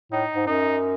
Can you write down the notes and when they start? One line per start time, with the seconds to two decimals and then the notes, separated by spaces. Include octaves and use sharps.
0.12 A2 D#4
0.36 G#2
0.47 F#2 D#4